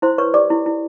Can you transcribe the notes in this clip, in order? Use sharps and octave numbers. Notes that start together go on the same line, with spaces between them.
E4 C5 C6
B4 C#5 C#6
G4 D5 D6
E4
E4